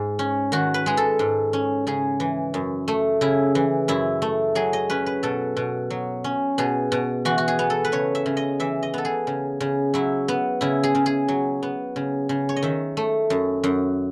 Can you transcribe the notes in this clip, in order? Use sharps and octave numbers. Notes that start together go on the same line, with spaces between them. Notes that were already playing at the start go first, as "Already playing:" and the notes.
Already playing: G#2 G#3
C#4
D#3 F#4
B4
G#3 G#4
A4
G#2
C#4
C#3 G#4
E3
F#2
A3
C#3 E4
E3
F#2 E4
A3
F#3 G#4
D#5
C#4 B4
B4
B2 A4
B2
F#3
C#4
B2 G#4
B2
E3 F#4
F#4
G#4
B3
A4
B4
C#3 C#5
E5
C#3
D#5
E3 E5
D#5
B3 A4
G#4
C#3
C#3
F#3 E4
B3
C#3 E4
G#4
C#3
G#4
F#3
B3
C#3
C#3
C#5
D#5
D#3 E5
A3
F#2
F#2